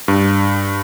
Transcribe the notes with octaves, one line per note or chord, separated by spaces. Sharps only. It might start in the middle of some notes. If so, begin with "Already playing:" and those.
G2